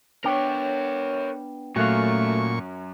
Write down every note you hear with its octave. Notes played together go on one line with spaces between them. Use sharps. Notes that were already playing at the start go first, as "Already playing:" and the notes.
B3 D4 A#4 C#5 G5
F#2 A#2 A3 F#4 F5 C#6